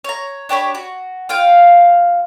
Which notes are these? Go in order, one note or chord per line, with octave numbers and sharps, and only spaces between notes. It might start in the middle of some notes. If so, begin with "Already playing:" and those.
C#5 A#5
D4 G4 C#5 B5
F#4
F4 F5 G5